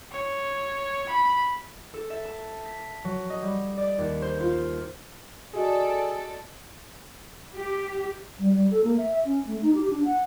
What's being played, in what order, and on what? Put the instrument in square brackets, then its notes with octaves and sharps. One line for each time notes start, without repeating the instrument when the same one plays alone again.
[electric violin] C#5
B5
[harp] A4
E5
A5
B6
F#3
D#5
G3
D5
D#2
C5
F4
[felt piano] F#4 D#5 [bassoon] G#4 [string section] A4 D5
[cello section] G4
[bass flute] G3
G3
A4
A#3
E5
E5
C#4
A3
D#4
G4
D4
F#5